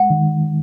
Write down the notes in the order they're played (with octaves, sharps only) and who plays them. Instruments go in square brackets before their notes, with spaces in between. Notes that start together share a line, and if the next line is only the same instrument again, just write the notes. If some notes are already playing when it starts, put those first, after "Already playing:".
Already playing: [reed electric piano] G#3 [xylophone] F#5
[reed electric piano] D#3